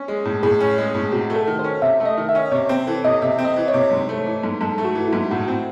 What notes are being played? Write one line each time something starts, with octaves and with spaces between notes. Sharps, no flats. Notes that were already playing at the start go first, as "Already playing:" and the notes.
Already playing: C#4
G#3
A2
A2 G#4
C#4
G#3
A2
C3 F#4
A3
A4
D#3
C5
C#4
C3 E5
A3
D#5
D#3
E5
C#4
C3 C#5
C4 C5
E3 A4
C3 D#5
C3 E5
C4
D#5
E3
C#5
C3
G#2 C5
A3
E3
G#2
G#2 A4
A3
F#4
E3
E4
G#2
A2 F#4
C4